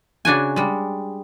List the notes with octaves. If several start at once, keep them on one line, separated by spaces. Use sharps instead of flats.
C#3 D4 F#4 G#5
G3 G#3